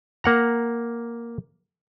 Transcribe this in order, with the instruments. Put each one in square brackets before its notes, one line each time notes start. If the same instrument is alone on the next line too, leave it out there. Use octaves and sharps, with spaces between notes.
[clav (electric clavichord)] A#3 F#5 A#5